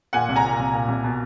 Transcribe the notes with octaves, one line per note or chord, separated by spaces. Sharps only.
A#2 F#5 G#5
C2
G#5 A#5
A#2
C2
A#2
C2
B2